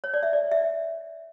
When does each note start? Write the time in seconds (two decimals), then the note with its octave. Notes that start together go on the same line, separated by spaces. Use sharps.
0.04 C#5
0.14 D5
0.23 E5
0.33 D5
0.52 E5